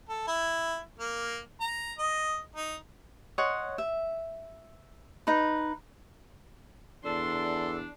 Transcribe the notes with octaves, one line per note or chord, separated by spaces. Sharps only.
A4
E4
A#3
A#5
D#5
D#4
C#5 D#5 F#5 C6
E5
D#4 B4
E2 D4 A4 C6